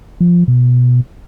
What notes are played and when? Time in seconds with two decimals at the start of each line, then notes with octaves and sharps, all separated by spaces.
0.20 F3
0.48 B2